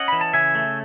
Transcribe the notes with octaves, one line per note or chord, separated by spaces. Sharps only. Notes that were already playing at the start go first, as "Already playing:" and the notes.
Already playing: C#4 D#5 F#5
E3 B5
A5
C#3 E5 G#5
A3